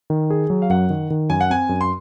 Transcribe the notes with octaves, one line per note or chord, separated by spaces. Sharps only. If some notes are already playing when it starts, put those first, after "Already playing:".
D#3
G#4
F#3
F5
F#2 F#5
D#3
D#3
F#2 G#5
F#5
C4 G#5
F#2
C6